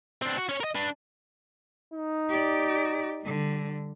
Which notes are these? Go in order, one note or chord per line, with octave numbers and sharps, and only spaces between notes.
C4 D4
F#4
C#4 C#5
A#4 D#5
D4 B4
D#4
G4 D5
D3 G3